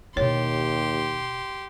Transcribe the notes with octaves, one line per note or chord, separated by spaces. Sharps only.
D#2 B2 E4 G4 C#5 C6